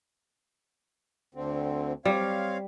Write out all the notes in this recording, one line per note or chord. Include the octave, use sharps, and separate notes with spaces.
D2 D3 C4
G3 C4 C#5 F5